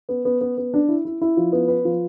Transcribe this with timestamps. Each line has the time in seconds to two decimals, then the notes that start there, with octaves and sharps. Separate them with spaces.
0.09 B3
0.25 B3
0.41 B3
0.58 B3
0.74 D4
0.89 E4
1.05 E4
1.21 E4
1.37 F3
1.53 B3
1.68 B4
1.85 F3